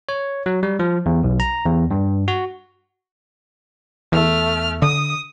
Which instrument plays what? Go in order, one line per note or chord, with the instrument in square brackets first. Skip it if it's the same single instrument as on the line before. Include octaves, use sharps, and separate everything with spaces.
[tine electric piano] C#5
F#3
G3
F3
E2
B1
A#5
E2
G2
F#4
[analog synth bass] E2 [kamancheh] A3 F6
[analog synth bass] D3 [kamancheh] D#6